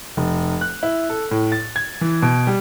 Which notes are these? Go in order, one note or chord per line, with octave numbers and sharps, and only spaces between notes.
F1
F#6
E4
A4
A2
A6
G#6
E3
B2
G3